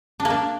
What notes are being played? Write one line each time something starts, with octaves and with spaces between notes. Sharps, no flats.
D4
A#3
D4